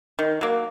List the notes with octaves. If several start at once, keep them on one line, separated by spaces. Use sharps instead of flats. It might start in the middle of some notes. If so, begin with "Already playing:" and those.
D#3
F#3 A#3